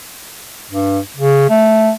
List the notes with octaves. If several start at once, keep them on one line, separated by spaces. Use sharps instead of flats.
G2
C#3
A3